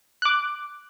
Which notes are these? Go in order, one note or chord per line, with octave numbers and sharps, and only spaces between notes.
D6 F#6